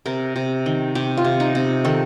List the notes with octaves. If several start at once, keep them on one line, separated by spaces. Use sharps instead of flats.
C3 A#4
C3
D#3
C3 G4
F4
C3
D#4
C3
D#3 A4